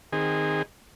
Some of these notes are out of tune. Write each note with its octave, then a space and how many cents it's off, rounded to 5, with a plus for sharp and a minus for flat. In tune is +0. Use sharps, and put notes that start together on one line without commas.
D#3 +0 C4 -10 G#4 -20